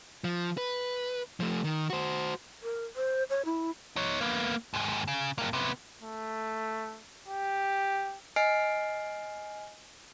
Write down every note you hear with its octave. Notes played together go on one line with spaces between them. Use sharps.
F3
B4
F3 A3
D#3
F#4 C5
A#4
C5
C#5
E4
D#4 C#5
A#3 B3
D#2 G#2
C#3
G2 A#3
C3 B3
A3
G4
D#5 G#5 F6 C7 D7